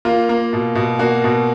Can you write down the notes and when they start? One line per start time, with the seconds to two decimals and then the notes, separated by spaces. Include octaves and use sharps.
0.05 A#3 F4
0.29 A#3
0.53 B2
0.75 B2
0.99 A#3 F#4
1.24 B2